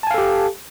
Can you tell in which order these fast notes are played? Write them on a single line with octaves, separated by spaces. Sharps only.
A5 G#5 F5 A4 G4